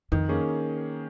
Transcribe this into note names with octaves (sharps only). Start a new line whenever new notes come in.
F2 D#3
A#3 C#4 G#4